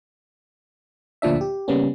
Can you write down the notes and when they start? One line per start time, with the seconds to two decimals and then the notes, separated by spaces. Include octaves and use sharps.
1.22 D2 A#2 F3 D4 E5
1.41 G4
1.68 C#3 G3 A#3 B3 C#4